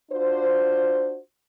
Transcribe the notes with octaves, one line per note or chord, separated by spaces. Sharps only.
D4 F4 F#4 C5